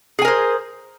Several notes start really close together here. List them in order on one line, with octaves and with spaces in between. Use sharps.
G#4 G#5 A#4 C5